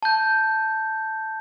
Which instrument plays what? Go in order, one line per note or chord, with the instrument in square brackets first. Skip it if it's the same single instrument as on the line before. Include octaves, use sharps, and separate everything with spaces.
[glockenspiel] A5 G6